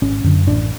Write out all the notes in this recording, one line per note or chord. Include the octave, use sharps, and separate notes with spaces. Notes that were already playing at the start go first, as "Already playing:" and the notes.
G#1 C#4
F#2 D3
A1 D4